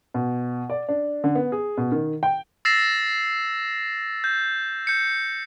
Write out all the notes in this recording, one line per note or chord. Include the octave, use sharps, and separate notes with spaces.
B2
D5
D4
D3
B3
G#4
B2
D#3
G5
E6 A6 A#6 C7 E7
G6
G6 C#7